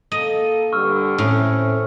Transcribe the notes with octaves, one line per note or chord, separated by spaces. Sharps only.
A#3 A4 D#5
G2 D3 C#6 E6 F6
A2 A3 C4 C#4